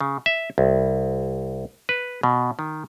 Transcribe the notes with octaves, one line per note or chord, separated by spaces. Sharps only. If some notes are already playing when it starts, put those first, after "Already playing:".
C#3
E5
C2
B4
B2
D#3